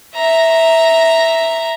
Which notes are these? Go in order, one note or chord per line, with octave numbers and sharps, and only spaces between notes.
E5 A#5